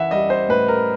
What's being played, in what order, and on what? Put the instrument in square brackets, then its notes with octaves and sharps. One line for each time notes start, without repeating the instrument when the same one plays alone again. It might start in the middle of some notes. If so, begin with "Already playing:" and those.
Already playing: [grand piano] E3 E5 F#5
G3 D#5
C5
A2 B4
A#4